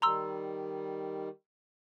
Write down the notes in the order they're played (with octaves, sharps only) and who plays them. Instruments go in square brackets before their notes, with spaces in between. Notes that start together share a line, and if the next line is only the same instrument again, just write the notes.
[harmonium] D#3 G3 [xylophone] A#5 C6 E6